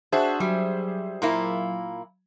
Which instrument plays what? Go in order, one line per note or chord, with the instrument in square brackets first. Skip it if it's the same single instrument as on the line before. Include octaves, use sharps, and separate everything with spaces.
[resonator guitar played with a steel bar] D4 F#4 [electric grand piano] G#4 C5 E5
[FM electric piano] F#3 [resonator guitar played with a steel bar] G3
[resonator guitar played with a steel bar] A#2 A#3 E4